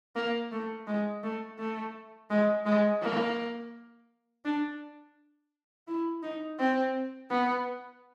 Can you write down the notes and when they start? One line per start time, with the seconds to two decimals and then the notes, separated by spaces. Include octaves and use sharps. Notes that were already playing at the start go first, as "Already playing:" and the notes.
0.16 A#3
0.52 A3
0.87 G#3
1.23 A3
1.59 A3
2.30 G#3
2.66 G#3
3.01 A#3
4.45 D4
5.88 E4
6.23 D#4
6.59 C4
7.30 B3